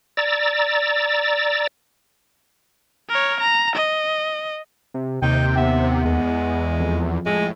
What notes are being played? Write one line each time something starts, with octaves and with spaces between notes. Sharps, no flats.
D5 A#5 E6 A6
A#4 C#5
A#5
D#5
C3
D#2 C3 D#4 G5
B3 E5
E2 G#3
F2
A2 G#3